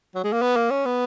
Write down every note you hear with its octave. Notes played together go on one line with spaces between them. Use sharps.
F#3
G#3
A#3
B3
A#3
C#4
B3